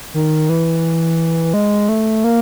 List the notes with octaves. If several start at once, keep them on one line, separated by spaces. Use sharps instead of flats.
D#3
E3
G#3
A3
A#3